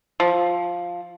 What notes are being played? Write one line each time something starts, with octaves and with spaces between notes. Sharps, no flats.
F3